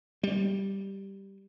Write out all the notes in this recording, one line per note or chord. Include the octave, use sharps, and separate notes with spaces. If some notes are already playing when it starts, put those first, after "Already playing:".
G3